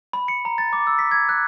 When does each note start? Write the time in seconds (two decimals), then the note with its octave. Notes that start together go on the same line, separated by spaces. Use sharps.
0.13 B5
0.28 C#7
0.45 A#5
0.58 A6
0.73 D6
0.87 E6
0.99 B6
1.11 G#6
1.29 F#6